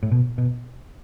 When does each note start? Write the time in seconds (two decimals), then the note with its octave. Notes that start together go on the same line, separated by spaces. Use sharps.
0.03 A2
0.12 B2
0.38 B2